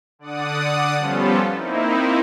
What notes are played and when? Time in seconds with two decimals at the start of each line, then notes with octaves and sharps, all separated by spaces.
0.19 D3 D5 F#5 D#6
0.98 F3 G3 B3 C#4 F4 A4
1.53 A#3 C4 D#4 E4